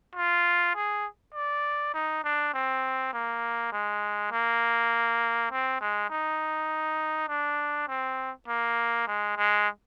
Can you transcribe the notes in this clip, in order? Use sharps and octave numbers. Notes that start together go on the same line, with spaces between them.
F4
G#4
D5
D#4
D4
C4
A#3
G#3
A#3
C4
G#3
D#4
D4
C4
A#3
G#3
G#3